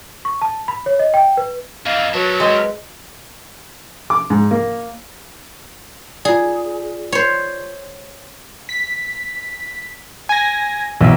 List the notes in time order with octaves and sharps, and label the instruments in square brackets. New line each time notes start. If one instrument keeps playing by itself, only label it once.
[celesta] C#6
A5
B5
C#5
D#5
G5
B4
[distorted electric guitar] F2 E3 [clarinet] D#5 [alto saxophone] F5
[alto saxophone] F#3 [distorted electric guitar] A#4 A5 [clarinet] B4
[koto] G#3 C4
[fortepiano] D6
G#2
A#3
[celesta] F4 D5 [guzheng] G#4
[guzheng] C5 C#5
[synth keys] B6
G#5 A#6
[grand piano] B1 [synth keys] E3